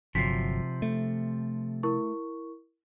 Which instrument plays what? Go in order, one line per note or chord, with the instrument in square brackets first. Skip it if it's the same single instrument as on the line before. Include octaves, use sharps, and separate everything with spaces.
[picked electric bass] G1 F#3 [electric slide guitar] C3 F3 [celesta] B6 C7
[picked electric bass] A3
[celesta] E4 A#4 C#6